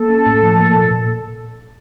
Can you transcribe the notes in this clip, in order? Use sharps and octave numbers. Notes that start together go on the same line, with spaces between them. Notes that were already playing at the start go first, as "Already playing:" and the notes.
Already playing: A#3 A4
C#4
A2
F3
A#3
A#2
A#2